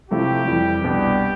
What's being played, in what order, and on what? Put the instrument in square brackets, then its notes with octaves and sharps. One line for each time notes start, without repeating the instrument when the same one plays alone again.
[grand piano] C3 F3 A3 E4 [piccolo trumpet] G4
[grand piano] F2 E3 G3
[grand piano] C2 B2 G3 B3 D4 [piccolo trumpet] G4